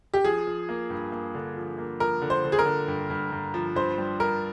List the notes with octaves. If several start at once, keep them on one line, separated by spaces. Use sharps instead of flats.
G4
F3 G#4
F3
A#3
G2
A#3
D3
F3
A#3
F3 A#4
D3
C5
D3
G#4
A#4
D3
G2
G2
G2
F3
G2 C5
G3
G2 A#4